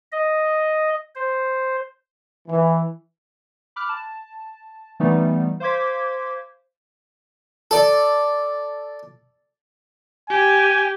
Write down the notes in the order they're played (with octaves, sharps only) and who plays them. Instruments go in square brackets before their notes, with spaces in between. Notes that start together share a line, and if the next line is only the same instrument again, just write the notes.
[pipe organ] D#5
C5
[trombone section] E3
[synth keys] B5 D6 F6 F#6
A5
E3 G3 A3 B3 D#4
C5 F5 C6 D6 G#6 B6
[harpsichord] A4 D5
[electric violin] G4 [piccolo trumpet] G#5